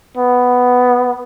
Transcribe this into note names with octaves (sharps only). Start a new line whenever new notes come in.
B3